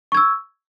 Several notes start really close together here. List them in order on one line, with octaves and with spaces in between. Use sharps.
C#6 G#6 E6